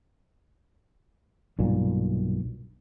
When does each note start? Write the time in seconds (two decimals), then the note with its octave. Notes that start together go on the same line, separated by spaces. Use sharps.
1.59 B1 G2 A#2